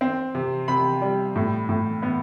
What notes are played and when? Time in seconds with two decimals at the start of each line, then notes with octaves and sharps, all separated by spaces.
0.01 C4
0.35 C3
0.68 C3 B5
1.02 G3
1.36 A2
1.69 A2
2.02 B3